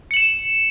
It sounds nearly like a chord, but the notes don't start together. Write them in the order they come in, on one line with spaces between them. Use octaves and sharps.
C#7 F#7 E7